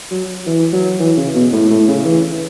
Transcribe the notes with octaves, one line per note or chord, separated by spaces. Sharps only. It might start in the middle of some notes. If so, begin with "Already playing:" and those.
F#3
E3
F#3
E3
C#3
B2
A2
A2
C#3
E3